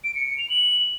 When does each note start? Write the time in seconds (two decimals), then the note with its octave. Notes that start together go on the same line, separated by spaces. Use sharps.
0.04 D7
0.15 C#7
0.27 C#7
0.38 F7
0.50 F#7